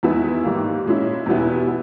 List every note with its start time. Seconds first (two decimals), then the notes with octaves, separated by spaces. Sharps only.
0.03 E2 D#3 G#3 B3 E4
0.44 G#2 D#3 G3 A#3
0.85 A#2 G#3 C#4 E4
1.26 E2 B2 G3 B3 E4
1.67 B3